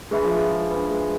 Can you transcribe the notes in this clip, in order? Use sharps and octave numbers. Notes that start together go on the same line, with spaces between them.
G#3 D4 G#4 B4 E5 B5
F3
G#3
D4 G#4 B4 E5 B5
G#3